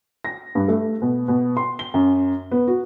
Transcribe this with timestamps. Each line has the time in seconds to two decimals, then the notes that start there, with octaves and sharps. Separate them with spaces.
0.25 A#6
0.55 G2
0.68 A3
1.02 B2
1.28 B2
1.57 C6
1.79 G7
1.94 F#2
2.51 B3
2.68 F#4